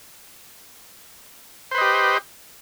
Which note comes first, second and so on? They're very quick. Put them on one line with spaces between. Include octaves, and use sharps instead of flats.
C5 B4 D#5 G4